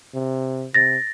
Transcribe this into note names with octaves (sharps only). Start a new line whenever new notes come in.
C3
C3 A6 A#6